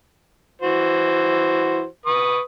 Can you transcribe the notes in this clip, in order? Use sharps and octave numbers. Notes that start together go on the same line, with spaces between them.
E3 F#4 C5
B4 C#6 D#6